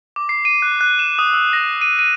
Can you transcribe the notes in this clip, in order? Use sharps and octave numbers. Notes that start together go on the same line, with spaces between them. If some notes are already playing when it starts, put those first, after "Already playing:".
D6
C7
D#7
F#6
F#6
E7
D#6
E6
A#6
D#7
D#7